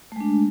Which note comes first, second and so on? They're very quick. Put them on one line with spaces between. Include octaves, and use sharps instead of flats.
A3 G#3 D4